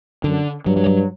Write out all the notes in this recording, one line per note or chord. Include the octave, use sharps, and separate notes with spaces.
F#2 D3
G2 F#3
F#3
F#3